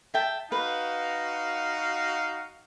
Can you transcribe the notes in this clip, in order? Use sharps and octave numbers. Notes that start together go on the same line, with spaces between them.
E5 G5 A5
D#4 F#4 B4 F5